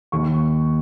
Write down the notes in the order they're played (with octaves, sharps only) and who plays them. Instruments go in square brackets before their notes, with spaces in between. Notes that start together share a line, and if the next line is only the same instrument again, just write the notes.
[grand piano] D#2 D#3 C#6